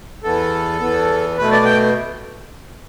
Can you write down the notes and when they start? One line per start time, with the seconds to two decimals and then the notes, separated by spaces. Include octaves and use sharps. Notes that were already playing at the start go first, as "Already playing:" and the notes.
0.24 E2 E3 B3 A4
0.80 E2 E3 B3
1.37 B2 A3 B4
1.52 D5
1.65 G5